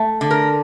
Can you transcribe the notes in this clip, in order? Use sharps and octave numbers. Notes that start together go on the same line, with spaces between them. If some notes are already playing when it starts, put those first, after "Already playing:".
Already playing: A3
D3
A#4